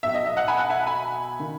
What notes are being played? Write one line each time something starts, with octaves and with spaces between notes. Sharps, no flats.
B1 B2 E5
D#5
E5
D#5 F#5
G#5 B5
F#5 A5
E5 G#5
G#5 B5
D#3